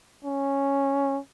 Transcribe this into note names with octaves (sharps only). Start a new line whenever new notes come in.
C#4